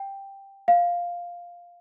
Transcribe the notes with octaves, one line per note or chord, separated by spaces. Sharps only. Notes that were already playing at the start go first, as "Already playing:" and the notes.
Already playing: G5
F5